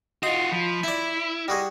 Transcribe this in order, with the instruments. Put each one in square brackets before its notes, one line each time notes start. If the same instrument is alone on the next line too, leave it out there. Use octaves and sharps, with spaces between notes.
[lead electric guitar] F4 F#4 [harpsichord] D#5 [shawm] C6
[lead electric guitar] F3 [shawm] B5
[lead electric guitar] E4 [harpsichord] D5 E5
[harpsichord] G3 F#4 G#4 [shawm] D#5